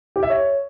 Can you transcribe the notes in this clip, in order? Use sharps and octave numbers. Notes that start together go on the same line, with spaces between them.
G4
E5
C#5